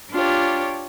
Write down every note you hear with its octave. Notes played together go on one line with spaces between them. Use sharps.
D4 F4 G4 C#5